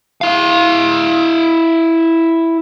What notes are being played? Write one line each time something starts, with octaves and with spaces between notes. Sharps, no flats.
E4 F5